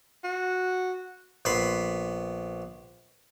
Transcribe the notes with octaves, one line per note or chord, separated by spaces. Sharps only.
F#4
A#1 B3 B5 C6